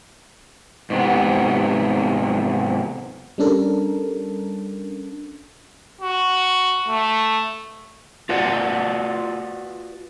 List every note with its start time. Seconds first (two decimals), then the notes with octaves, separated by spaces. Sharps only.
0.90 G#2 C3 B3
3.38 G3 C#4 D4 A4 A#4
6.01 F#4
6.89 A3
8.29 F4 F#4 B4 D5 F#5